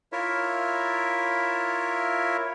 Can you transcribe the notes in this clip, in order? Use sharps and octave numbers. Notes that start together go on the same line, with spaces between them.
E4 F4 A#4 C#5 E5